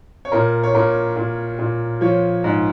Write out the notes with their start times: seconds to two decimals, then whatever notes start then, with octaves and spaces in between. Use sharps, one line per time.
0.25 C#5
0.32 A#2 A#4
0.63 C#5
0.74 A#2 A#4
1.16 A#2
1.59 A#2
2.01 F3 C#5
2.44 G#2